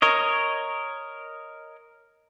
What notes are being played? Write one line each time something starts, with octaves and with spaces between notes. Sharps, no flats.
A#4 C#5 D#5